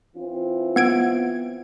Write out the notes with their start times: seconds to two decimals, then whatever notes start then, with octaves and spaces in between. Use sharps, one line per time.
0.16 E3 C4 F4
0.76 B3 G#6 D7